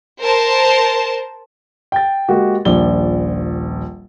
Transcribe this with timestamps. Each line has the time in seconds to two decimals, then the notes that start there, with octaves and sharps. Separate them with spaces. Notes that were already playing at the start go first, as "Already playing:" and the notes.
0.21 A#4 C5 A5
1.92 G5 A6
2.28 G#3 A#3 F#4 G4
2.65 D#1 A#1 D5 G7